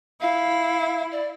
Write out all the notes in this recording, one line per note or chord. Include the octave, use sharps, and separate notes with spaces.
E4 F5
D5